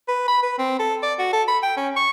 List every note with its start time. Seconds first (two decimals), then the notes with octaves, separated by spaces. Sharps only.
0.08 B4
0.28 B5
0.43 B4
0.59 C4
0.79 A4
1.03 D5
1.19 F#4
1.33 A4
1.48 B5
1.63 G5
1.77 C#4
1.96 C#6